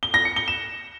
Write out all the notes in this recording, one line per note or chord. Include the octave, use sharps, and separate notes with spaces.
G7
A#6
C#7
G7
E7